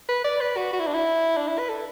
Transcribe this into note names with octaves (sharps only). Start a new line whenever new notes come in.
B4
D5
B4
F#4
F#4
E4
D4
E4
D4
E4
B4
A4